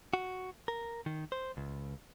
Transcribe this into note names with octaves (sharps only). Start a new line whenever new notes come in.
F#4
A#4
D#3
C5
C#2